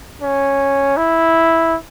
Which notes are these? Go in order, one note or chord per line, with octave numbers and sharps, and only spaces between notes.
C#4
E4